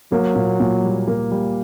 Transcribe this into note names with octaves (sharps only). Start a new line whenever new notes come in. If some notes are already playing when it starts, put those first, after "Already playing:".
F#3 A#3
A#2
A#2
G3
A#3
G3